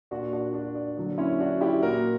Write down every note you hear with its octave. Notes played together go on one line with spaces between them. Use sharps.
A#2 A#3 D4 F#4
D4 F#4
D4 F#4
D4
D3 F#3 A#3 D4
C#4 E4
D4 F#4
E4 G4
A#2 A#3 F#4 A#4